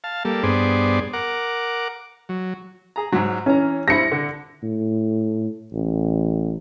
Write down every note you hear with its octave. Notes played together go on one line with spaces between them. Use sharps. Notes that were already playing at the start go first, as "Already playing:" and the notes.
F5 A5
G3 A#3 A4
G2 B3 G#4 C5 D5
A#4 F#5 D6
F#3
G#4 A#5
G#2 F#3
E3 C#4 A#5
G3 C4 E4 A#6 C#7
D3
A2
A1